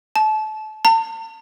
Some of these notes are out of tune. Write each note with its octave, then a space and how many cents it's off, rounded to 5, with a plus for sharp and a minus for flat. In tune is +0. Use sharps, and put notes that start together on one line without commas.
A5 -30
A5 +40